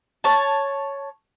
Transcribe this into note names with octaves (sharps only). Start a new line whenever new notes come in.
C#5 A5